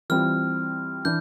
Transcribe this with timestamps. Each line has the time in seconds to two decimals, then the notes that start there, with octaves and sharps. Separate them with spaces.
0.10 E3 G3 C4 F4 F6
1.05 E3 D4 G6